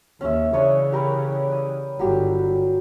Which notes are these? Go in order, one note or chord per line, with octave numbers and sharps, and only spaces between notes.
D#2 C#4 E5
C#3 E3 D4 C#5 D#6
G4 A#4 B4
D#6
G1 F#3 G4